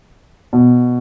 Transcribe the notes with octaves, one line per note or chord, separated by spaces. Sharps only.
B2